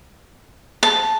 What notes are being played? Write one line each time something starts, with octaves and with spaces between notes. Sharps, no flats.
A5